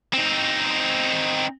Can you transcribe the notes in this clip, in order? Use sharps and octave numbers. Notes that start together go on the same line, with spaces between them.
C4 D#4